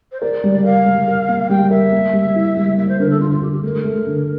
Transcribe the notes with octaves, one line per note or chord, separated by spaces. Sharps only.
C5
A#4 D5
G3
A#4 F5
G3
A#4
A#3
G3 G5
A#4 E5
A#3
G3
E4
G3
A#3 E5
C5
D3 A#4
A4
D3 F4
F4
D3 G4
G4
A3 A#4
A3
D3